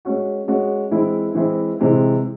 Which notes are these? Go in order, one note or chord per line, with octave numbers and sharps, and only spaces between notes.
G#3 C#4 F#4
G#3 C#4 F#4
E3 G#3 C4 E4
E3 G#3 C4 E4
C3 E3 G#3 C4